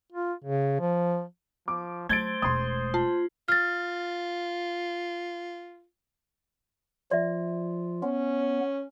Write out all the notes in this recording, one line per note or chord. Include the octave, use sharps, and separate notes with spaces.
F4
C#3
F3
F3 D6
F#3 A3 C5 G#6 A6 D7 G7
E1 G#3 C6 D#6
F4 A5
F4 F6 A6
F3 F4 D5 E5
B3 C#4